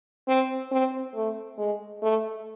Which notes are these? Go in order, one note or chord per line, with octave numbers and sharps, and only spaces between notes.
C4
C4
A3
G#3
A3